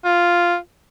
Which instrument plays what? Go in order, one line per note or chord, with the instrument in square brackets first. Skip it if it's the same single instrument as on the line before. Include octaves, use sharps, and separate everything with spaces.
[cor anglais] F4